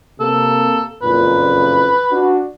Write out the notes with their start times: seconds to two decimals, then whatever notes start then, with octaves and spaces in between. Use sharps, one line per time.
0.20 C3 A#3 A4
1.02 F#1 F2 A#2 B4
2.11 D4 F#4